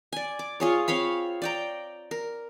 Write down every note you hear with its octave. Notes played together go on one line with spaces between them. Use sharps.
D5 G#5
D6
F4 G#4 C#5
C4 C#5 F5 B5
D5 G5 A#5
A#4